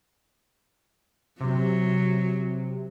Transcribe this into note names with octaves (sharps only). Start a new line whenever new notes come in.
C3 F#3